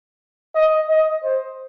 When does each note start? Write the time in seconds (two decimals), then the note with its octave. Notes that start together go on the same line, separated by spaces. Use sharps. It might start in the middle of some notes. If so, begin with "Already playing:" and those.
0.55 D#5
0.89 D#5
1.24 C5